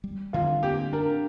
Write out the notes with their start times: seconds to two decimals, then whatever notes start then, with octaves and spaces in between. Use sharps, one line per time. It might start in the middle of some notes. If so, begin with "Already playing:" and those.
0.04 G3
0.33 D3 F4
0.63 A#3 G4
0.93 D4 A#4